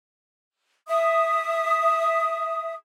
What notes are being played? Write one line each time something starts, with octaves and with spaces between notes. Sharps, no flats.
E5 D#6